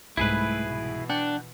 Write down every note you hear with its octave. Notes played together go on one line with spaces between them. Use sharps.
C2 G#2 A3 E4 G#4 B4
B2 E3
D4 F#5 G5